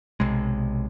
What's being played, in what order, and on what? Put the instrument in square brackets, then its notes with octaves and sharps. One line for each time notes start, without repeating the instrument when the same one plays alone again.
[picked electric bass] B1 C3 G#3